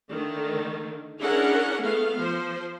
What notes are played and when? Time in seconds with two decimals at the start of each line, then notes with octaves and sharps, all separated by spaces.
0.10 D3 D#3 A3
1.19 C#4 D4 E4 G#4 A#4 F#5
1.82 A3 B3 F5
2.18 F3 C5